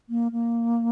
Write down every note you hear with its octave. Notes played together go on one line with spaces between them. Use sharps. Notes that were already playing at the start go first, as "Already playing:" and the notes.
A#3
A#3